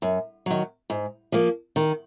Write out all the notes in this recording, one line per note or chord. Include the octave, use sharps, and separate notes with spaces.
F#2
D#3 F#3
G#2
F3 A#3
D#3